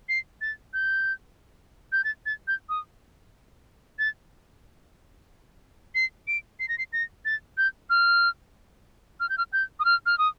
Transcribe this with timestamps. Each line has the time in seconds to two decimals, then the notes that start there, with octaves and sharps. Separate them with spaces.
0.09 C7
0.41 A6
0.74 G6
1.92 G6
2.04 A6
2.26 A6
2.48 G6
2.69 D#6
3.99 A6
5.95 C7
6.28 D7
6.60 C7
6.69 A#6
6.78 C7
6.93 A#6
7.25 A6
7.58 G6
7.90 F6
9.20 F6
9.29 G6
9.38 F6
9.53 G6
9.80 D#6
9.85 F6
10.06 F6
10.18 D#6